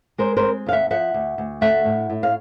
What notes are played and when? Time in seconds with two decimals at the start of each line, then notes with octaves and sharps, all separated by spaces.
0.18 G#3 A#4 C5
0.37 A#4 C5
0.43 C4
0.66 D#2 F5
0.72 E5 F#5
0.91 F3 E5 F#5
1.14 D2
1.38 D2
1.61 A3 E5 F#5
1.85 A2
2.10 A2
2.23 F5